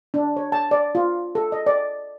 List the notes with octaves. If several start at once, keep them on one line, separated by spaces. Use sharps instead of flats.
D4
C#5
A5
D5
F4
A4
D#5
D5